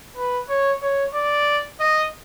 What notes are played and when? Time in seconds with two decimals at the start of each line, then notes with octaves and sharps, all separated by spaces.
0.16 B4
0.49 C#5
0.82 C#5
1.14 D5
1.80 D#5